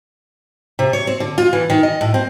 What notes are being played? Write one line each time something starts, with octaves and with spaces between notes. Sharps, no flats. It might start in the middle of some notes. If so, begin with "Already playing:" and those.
C3
C#5
C4
D3
F4
E3
D#3
D#5
A2
C4